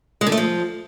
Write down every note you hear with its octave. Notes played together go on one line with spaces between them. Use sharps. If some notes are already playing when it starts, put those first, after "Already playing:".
G#3
D3
A3
F3